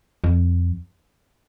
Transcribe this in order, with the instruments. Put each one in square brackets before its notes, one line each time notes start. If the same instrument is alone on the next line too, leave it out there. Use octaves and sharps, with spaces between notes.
[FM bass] F2